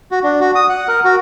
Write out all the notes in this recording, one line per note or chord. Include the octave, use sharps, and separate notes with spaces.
F#4
D4
F#4
D#6
F#5
A#4
F#4